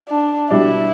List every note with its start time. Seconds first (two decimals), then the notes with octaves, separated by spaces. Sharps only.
0.09 D4
0.51 B2 G3 D4 E4